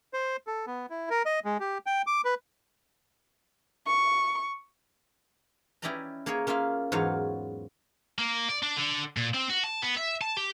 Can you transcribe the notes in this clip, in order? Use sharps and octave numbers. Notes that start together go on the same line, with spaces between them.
C5
A4
B3
E4
A#4
D#5
G#3
G4
G5
D6
B4
C#6
C#4 E4 G4 D5 D#5 A#5
A#3 G#4 A#4 C#5
A#3 C#4 F4 E5 F5
E2 G#2 F#3 F4 C#5 F5
A#3
D5
D4
D3
A#2
C4
F#4
A5
B3
E5
A5
G4